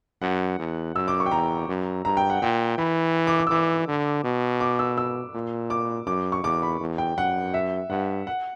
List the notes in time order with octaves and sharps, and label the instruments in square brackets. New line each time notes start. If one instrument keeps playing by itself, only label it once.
[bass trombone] F#2 [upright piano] F#5
[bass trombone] E2
[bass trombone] F#2 [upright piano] E6
[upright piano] D6
C#6
G5
[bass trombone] E2 [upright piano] A#5
[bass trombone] F#2
[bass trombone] G2 [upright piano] A#5
[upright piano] G5
F#5
[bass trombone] A#2 [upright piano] G5
[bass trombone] E3 [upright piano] B5
[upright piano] D6
D6
E6
[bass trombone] E3 [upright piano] D6
[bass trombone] D3
B2
[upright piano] D6
E6
E6
[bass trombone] A#2
[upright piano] D6
[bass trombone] F#2 [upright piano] D6
[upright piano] C#6
[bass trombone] E2 [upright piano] D6
[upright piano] B5
[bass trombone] E2
[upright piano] G5
[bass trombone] F#2 [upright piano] F#5
[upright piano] E5
[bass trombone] G2 [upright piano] F#5
[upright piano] F#5